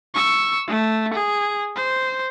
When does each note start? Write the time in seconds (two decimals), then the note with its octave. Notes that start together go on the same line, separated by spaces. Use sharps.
0.15 C#6 E6
0.68 A3
1.14 G#4
1.76 C5